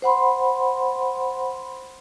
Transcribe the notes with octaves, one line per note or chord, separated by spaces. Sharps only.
C5 F#5 B5 C6